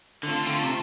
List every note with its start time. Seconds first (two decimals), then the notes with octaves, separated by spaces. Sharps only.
0.23 D3 A3 C4 F4 A4
0.47 D3
0.64 C3